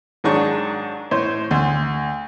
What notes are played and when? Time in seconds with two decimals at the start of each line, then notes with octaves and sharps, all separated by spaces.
0.24 G#2 D#3 F#3 D4 G#4 C#6
1.11 A2 C5 C#5
1.51 D2